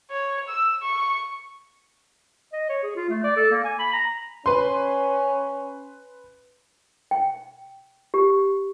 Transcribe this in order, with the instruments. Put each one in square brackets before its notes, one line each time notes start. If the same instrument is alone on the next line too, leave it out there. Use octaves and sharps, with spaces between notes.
[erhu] C#5
E6
C#6
[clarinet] D#5
C#5
G#4
F4
A3
D5
A4
A#3
G#5
B5
A#5
[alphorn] C#4 [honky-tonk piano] B4 C6
[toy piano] G5
G4